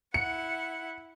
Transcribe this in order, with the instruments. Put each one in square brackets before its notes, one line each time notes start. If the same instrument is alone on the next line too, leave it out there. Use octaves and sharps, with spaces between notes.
[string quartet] E4 F#5 [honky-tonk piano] C#7